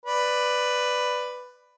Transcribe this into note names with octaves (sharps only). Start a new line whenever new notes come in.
B4 D5